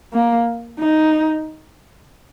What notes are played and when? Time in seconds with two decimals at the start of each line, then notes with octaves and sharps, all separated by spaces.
0.13 A#3
0.79 D#4